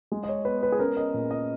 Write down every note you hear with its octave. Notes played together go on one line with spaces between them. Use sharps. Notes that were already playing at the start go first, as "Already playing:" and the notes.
G#3
D#5
C#5
B3 B4
B4
G#4
C#4 A#4
D#5
A#2
D#5